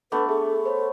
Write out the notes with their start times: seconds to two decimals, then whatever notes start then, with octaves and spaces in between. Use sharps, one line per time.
0.12 A3 B3 D4 A4 B4 D6
0.29 G#4 A4 E5
0.66 C5 C#5